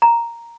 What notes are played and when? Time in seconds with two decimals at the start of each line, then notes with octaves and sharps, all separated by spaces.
0.02 A#5